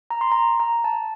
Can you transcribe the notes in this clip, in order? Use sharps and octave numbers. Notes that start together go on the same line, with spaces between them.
A#5
C6
A#5
A#5
A5